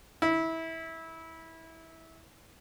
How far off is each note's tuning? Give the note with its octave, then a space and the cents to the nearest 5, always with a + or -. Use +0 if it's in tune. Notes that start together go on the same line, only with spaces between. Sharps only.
E4 -20